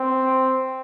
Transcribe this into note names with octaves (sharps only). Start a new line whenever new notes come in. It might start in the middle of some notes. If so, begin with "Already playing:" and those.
Already playing: C4